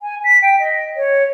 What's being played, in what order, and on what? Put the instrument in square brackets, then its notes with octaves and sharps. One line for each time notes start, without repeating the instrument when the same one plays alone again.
[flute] G#5
B6
G5
D#5
C#5